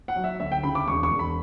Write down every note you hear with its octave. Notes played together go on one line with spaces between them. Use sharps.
F#5
F#3
E5
D2 E5
G5
C#3 B5
D6
E1 C#6
C#6
E1
B5